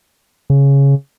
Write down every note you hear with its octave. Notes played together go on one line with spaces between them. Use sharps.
C#3